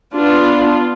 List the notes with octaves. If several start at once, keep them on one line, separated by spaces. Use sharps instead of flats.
B3 D4 F4